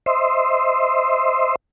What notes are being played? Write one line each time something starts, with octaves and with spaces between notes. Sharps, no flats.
C5 D#5 E5 C6